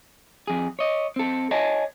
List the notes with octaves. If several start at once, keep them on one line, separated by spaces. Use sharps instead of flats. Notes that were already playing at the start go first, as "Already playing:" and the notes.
F2 G#4
C#5 D#5
C4 A4
C#5 D#5 G#5 A5